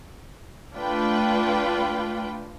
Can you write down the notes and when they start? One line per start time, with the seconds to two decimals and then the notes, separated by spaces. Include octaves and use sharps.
0.75 A3 D4 F4 B4 G5